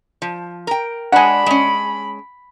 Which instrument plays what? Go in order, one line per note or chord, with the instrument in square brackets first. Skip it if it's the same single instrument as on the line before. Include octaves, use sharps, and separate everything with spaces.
[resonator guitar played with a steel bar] F3
A#4 G5
[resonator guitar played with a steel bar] G#3 D4 [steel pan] F#5 G#5 [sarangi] B5
[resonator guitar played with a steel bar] G#3 C#4